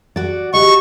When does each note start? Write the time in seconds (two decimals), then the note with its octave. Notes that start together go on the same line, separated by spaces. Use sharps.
0.16 F#4 D5
0.53 F#4 G4 D#5 C#6